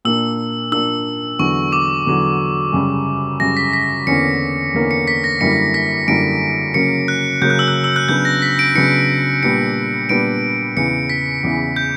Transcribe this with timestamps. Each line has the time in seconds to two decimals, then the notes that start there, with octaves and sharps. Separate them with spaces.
0.05 A#2 A#3 D4 E6
0.72 A#2 A#3 D4 E6
1.39 E2 D3 F#3 C#6
1.72 D6
2.06 E2 D3 F#3
2.73 F#2 C#3 G3
3.40 F#2 C#3 G3 A#6
3.57 B6
3.73 B6
4.07 E2 D3 A#3 C#4 C#7
4.74 E2 D3 A#3 C#4
4.91 C#7
5.07 B6
5.24 A#6
5.41 F#2 D3 G3 A#3 E4 C#7
5.74 B6
6.07 F#2 D3 G3 A#3 E4 D7
6.74 C#3 F#3 A#3 C#4 C#7
7.08 F#6
7.42 C#3 F#3 A#3 C#4 G6
7.50 F#6
7.59 E6
7.68 F#6
7.84 E6
7.96 F#6
8.09 C#3 F#3 B3 D4 G6
8.25 A#6
8.42 B6
8.59 D7
8.75 C#3 F#3 B3 D4 C#7
9.42 A#2 G3 B3 D4 G4 C#7
10.09 A#2 G3 B3 D4 G4 D7
10.77 E2 C#3 E3 C#7
11.09 B6
11.43 E2 C#3 E3
11.76 G6